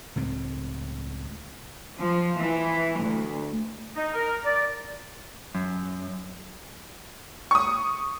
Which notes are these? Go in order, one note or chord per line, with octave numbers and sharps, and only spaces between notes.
C#2 A2 C4
F3
E3
D2
D#4
A#4
D5
F#2
C#6 D#6